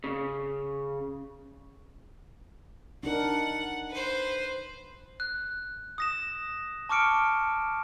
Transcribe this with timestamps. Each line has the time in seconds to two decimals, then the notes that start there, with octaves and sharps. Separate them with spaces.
0.04 C#3
3.03 D4 D#4 A#4 F#5
3.90 B4 C5
5.20 F#6
5.98 D#6 A#6 E7
6.89 A5 C#6 D6 F6 C#7 D7